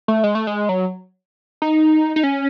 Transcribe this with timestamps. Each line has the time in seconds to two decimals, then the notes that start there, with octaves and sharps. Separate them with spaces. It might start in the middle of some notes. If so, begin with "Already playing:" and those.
0.08 A3
0.24 G#3
0.35 A3
0.47 G#3
0.69 F#3
1.62 D#4
2.16 D#4
2.23 C#4